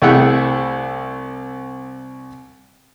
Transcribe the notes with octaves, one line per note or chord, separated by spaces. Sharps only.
C2 A3 E4 G#4 F#5 G5